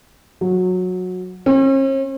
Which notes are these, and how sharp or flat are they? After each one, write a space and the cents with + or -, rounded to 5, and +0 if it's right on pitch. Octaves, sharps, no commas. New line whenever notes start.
F#3 -15
C#4 -45